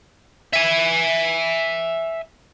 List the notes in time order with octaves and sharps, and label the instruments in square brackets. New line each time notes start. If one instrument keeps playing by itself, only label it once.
[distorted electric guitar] E5 G#5